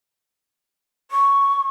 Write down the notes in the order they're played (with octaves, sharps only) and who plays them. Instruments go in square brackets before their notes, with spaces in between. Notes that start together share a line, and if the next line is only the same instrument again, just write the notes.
[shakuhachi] C#6